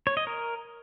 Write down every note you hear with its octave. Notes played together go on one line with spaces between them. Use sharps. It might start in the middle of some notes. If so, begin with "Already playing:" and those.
C#5
D#5
A#4